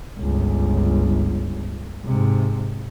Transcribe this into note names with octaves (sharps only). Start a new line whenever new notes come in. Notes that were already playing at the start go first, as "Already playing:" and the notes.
G1 C#2
G#2 C3